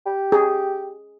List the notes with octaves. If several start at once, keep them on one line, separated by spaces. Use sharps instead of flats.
G4
G#4